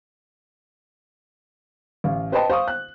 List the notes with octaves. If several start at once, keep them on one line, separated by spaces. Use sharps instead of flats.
A1 F5
B4 C5 D#5 G5 A5 C6
C5 F5 C#6 D#6
F#6